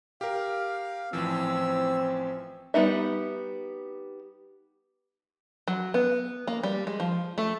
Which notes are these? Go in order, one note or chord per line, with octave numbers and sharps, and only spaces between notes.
G4 A#4 F5
A1 E3 F3 C4 E6
G3 B3 D#4 E5
F#3
B3
A#3
G3
G#3
F3
A3